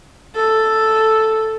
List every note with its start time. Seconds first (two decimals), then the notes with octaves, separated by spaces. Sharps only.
0.36 A4